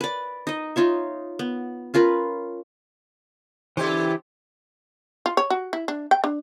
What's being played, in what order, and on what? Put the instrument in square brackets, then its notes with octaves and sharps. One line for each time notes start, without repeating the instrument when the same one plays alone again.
[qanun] B4 D5
D#4 D#5
D#4 F4 C#5 E5
B3
C#4 F4 A#4 B4
[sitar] C#3 G4 C5 [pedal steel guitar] E3 E4
[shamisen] F4
C#5
F#4
E4
D4
G5
D4